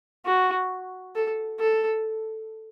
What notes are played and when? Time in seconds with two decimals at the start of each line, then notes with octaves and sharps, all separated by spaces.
0.25 F#4
1.15 A4
1.60 A4